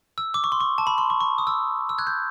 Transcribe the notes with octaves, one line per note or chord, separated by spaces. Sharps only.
E6
D6
C#6
C6
C#6
A5
B5
C6
C#6
C#6
D#6
E6
E6
F#6 G#6
G6